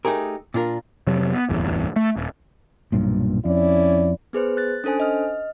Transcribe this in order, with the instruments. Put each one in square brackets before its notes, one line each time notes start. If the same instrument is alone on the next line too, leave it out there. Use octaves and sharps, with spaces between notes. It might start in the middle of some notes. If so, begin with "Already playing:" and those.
[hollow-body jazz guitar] A3 D#4 G4 G#4 A#4
A#2 D4 F4 A#4
[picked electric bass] F2 C3 F#3
B3
D1 G1 E2
A3
D#1
[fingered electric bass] B1 G2 A#2
[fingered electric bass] F2 [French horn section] C#4 E4 D5
[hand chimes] B3 G#4 B4 C5
F#6 A6
C#4 D4 A4 C5 G#5
D#5 F6